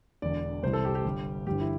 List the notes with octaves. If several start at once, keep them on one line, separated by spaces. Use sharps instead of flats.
E1 E2 D3 D5
C2 C3 E3 G3 C5
A4
G4
G4
G1 G2 G3
G1 G2 E3 G3 G4
E4